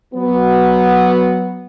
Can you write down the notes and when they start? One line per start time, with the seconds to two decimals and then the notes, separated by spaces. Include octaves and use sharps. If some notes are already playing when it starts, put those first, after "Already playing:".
0.14 F#3 B3